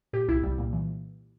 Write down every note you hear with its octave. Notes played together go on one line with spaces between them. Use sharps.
A#2 G4
C2 E4
C2 G3
A#2
E3